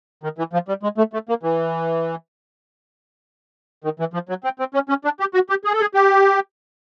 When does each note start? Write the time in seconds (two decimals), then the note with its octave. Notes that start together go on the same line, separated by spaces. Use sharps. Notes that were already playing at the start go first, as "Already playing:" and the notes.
0.23 D#3
0.38 E3
0.53 F3
0.68 G3
0.83 G#3
0.98 A3
1.13 A3
1.29 A#3
1.43 E3
3.84 D#3
4.00 E3
4.14 F3
4.29 F#3
4.44 C4
4.59 C4
4.74 C#4
4.89 C#4
5.05 D4
5.20 G4
5.34 F#4
5.50 G4
5.64 G#4
5.73 A4
5.81 G#4
5.94 G4